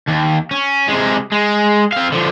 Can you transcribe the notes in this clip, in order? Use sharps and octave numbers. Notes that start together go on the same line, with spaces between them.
D#2
C#4
C3 G#3
G#3
C4 F5
D3 F3